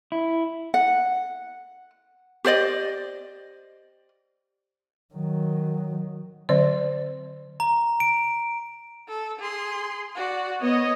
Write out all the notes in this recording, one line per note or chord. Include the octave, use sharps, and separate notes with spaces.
E4
F#5
G4 C5 D5 D#5
D#3 F#3
D3 F#3 C4 D5
A#5
D7
A4
G#4 C6
F#4 D5
B3 C#5 D#5